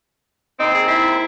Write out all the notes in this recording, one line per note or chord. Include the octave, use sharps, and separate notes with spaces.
D#2 C4 D#4
G#4
E4